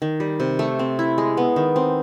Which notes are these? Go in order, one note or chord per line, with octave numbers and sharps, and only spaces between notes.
D#3
G3
C3
A3
C4
E4
G#3
B3
D#3
C4